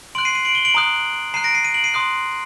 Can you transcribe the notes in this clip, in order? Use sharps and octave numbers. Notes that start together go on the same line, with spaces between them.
C6 F#6 D7 F#7
C7 D#7
C7 D#7
D7 F#7
D#7 G7
D7 F#7
A#5 D#6 F#6
A#5 F#6 C7 D#7
A#6 D7
C7 D#7
C7 D#7
D7 F#7
C7 D#7
C6 D#6 F#6